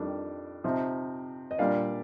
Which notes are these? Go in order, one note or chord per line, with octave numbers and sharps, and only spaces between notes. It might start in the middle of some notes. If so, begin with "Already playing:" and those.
Already playing: F2 D#3 G3 D4
C3 F3 C4 D#4
D#5
A#2 G3 D4 D5 F5